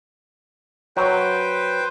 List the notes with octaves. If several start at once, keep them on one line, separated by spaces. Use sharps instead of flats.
F#3 B4 C5 G5